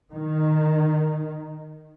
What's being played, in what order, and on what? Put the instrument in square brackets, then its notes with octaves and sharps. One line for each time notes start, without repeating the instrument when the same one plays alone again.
[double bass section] D#3